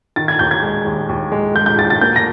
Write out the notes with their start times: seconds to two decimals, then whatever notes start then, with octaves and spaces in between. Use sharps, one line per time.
0.16 D#3 A6
0.28 G#6
0.39 D#2 G6
0.51 G#6
0.62 G#3
0.86 D#2
1.09 D#2
1.32 G#3
1.55 G#3 G6
1.66 G6
1.78 D#2 A6
1.90 A6
2.01 A#3 G6
2.16 A#6